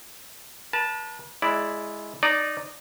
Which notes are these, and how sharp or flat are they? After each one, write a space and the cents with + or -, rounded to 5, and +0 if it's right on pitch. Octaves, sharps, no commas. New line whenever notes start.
B4 -45 A5 +0
G#3 +10 E4 +0 D5 +0
D#4 -20 D5 +0